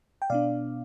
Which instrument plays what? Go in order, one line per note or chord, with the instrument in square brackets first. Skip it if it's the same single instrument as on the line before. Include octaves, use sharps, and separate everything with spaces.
[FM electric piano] G5
B2 B3 D4 D5 F5